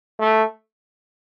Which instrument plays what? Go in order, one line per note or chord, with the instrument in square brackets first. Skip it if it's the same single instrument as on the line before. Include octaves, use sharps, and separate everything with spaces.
[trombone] A3